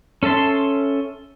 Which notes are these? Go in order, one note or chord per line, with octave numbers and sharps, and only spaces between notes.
C#4 A4 E5 A5 C6